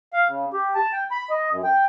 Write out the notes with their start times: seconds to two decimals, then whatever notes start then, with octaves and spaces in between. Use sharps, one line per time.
0.13 F5
0.28 C#3
0.53 G4
0.75 A5
0.93 G5
1.11 B5
1.30 D#5
1.51 F#2
1.64 G5